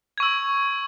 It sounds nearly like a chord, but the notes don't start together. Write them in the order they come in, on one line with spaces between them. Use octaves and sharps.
G#6 C#6 E6